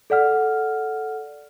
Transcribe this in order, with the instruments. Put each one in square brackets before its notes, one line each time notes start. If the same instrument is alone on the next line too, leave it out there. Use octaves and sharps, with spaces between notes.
[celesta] A4 D5 F#5 F6